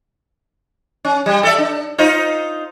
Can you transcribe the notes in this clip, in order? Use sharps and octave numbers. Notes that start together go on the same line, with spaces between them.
C#4
G3
A4 D5 E5
D4
D#4 F4 C5